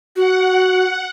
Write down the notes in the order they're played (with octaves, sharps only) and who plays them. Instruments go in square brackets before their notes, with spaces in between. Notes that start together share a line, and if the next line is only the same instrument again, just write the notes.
[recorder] F#4 [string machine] F#5